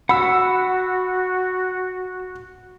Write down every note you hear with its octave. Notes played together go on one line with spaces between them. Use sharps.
F#4 F#5 B5 E6